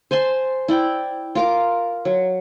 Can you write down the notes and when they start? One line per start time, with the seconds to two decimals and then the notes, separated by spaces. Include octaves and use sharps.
0.11 C5 G#5 A5 C6
0.68 E4 D5 G5
1.35 F4 A#4 D6
2.05 F#3